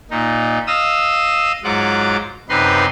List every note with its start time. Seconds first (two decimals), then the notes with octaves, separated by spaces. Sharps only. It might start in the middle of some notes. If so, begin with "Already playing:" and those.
0.10 A#2 D#4
0.67 D#5 F5 D#6 E6
1.64 G#2 F#3 F4 F#5 D6
2.49 F#2 C3 D#4 B4 C6